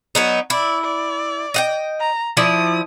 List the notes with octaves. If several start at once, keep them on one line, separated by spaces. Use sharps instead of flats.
F#3 B3 D#4
E4 D5
D5
D#5 F#5 G5
A#5
F3 E4 D5 D#6